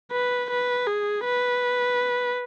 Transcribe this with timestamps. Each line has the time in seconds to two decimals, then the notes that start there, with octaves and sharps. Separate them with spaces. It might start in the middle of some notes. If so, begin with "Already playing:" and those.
0.12 B4
0.51 B4
0.87 G#4
1.25 B4